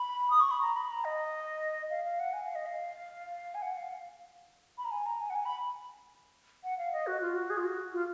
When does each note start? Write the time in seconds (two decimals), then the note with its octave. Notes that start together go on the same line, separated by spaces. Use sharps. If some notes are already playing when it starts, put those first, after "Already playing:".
Already playing: B5
0.30 D#6
0.41 C#6
0.51 B5
0.61 A#5
0.76 B5
0.91 A#5
1.05 D#5
1.90 F5
2.05 F5
2.20 F#5
2.33 G#5
2.44 F5
2.55 D#5
2.66 F5
3.55 G#5
3.62 F#5
3.77 F5
4.78 B5
4.85 A#5
4.91 G#5
5.06 A#5
5.21 G#5
5.30 F#5
5.35 G#5
5.45 B5
6.64 F#5
6.78 F5
6.93 D#5
7.07 F#4
7.21 F4
7.35 F#4
7.50 G#4
7.57 F4
7.65 F#4
7.93 F4